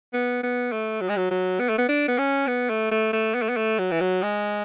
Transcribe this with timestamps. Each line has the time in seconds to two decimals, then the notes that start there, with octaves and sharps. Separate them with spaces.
0.14 B3
0.43 B3
0.72 A3
1.01 F#3
1.09 G#3
1.17 F#3
1.31 F#3
1.60 B3
1.69 A3
1.78 B3
1.89 D4
2.08 B3
2.18 C#4
2.47 B3
2.70 A3
2.92 A3
3.13 A3
3.35 B3
3.42 A3
3.49 B3
3.57 A3
3.79 F#3
3.91 E3
4.01 F#3
4.23 G#3